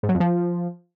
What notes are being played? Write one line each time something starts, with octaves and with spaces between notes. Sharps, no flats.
G#2
F#3
F2
F3